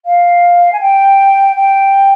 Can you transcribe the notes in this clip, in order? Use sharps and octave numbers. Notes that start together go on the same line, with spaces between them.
F5
G#5
G5
G5